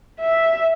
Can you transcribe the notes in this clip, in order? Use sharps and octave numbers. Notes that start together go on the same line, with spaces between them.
E5